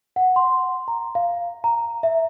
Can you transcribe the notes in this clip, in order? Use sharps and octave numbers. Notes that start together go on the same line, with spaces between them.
F#5
C6
A#5
F5
A#5
E5